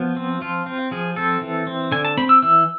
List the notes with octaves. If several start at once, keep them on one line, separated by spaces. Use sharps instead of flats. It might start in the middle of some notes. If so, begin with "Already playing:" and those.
Already playing: F3 B3
C4
F3 F4
C4
F3 G#4
C4 A4
E3
C4
D3 G#5
A5
C4 B5
E6
E3 E6